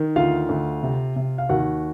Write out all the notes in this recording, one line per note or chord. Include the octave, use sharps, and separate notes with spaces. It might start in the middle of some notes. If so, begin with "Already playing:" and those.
Already playing: D#3
D2 F4 F5
D2
C3
C3
F5
D#2 F#4 F#5